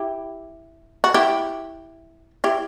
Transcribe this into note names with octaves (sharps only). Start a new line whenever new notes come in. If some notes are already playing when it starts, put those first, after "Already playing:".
Already playing: E4 G4
F#4
E4 G4
E4 G4